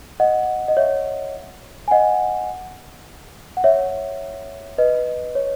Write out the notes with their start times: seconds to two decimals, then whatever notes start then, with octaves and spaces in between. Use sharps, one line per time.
0.20 D#5 F#5
0.68 D#5
0.77 C#5 E5
1.88 G#5
1.91 D#5 F#5
3.57 F#5
3.64 C#5 E5
4.78 B4 D#5
5.35 C#5